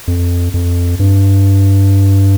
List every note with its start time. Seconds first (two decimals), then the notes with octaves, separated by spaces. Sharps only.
0.07 F2
0.54 F2
0.99 G2